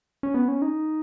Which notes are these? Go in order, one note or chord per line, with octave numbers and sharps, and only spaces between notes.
C#4
B3
C#4
D#4